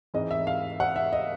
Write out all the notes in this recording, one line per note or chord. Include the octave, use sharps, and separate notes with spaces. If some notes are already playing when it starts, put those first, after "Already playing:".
G#2 E3 G#3 C4 D#5
E5
F5
F#5
E5
D#5